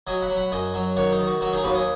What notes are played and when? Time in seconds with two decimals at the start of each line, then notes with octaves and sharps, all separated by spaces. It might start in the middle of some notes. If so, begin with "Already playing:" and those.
0.07 F#3 D#5 G#5
0.22 F#5 B5
0.29 F#3
0.37 F#5 B5
0.52 F#2 D#5 G#5
0.74 F#3
0.97 D#3 C#5 F#5
1.12 D#4
1.19 D#3
1.27 F#4
1.41 F#3 F#4
1.53 D#4 G#4
1.64 D#2 F#4 B4
1.75 D#5 G#5